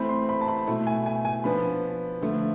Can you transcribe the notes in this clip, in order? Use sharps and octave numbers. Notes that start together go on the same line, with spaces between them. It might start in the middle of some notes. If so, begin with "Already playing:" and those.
Already playing: E3 A3 C4 B5
C6
B5
A5
B5
B2 A3 E4
G#5
G#5
G#5
F3 B3 D4 B5
D3 F3 A3